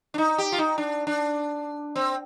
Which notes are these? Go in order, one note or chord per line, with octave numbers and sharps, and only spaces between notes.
D4
D#4
G4
F4
D#4
D4
D4
C4